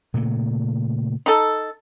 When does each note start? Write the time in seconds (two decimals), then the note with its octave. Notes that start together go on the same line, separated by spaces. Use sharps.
0.14 A#2 C#3 A3
1.26 D#4 A4